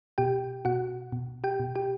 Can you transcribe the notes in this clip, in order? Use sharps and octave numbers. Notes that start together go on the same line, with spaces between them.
B2 G4 G5
B2 F#4 F#5
B2
G4 G5
B2
G4 G5